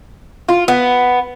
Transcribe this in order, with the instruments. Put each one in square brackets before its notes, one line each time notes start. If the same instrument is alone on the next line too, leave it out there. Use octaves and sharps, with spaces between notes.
[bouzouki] F4
B3